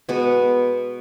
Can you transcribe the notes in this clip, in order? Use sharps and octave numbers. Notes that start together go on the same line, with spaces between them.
B2 G#3 B3